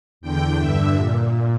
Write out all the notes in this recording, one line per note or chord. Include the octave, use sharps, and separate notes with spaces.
E2 D3 G5
G2 D3 E5
A#2